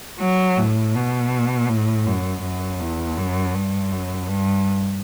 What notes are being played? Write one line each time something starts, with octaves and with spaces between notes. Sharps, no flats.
F#3
A2
B2
A2
F#2
F#2
E2
F#2
G2
F#2
G2